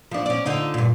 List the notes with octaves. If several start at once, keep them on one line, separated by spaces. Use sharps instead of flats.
F3 D4
C#4 D5
D3 D#4 F4
G2 A#2